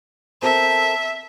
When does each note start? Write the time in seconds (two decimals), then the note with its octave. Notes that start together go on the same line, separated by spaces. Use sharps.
0.42 C4 A4 A#4 E5